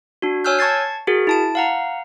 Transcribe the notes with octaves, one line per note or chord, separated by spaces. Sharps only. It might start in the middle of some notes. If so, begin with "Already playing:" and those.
D4 F#4
C#5 G#5 E6 F6 G6
A5 C#6 G#6 A6 C7
F#4 G#4 A#4
E4 A5 D7
F5 F#5 A#5